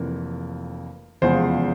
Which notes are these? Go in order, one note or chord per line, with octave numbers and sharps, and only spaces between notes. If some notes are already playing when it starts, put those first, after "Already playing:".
Already playing: F1 F2 E3 A#3
F1 E2 C#3 F3 G#3 C5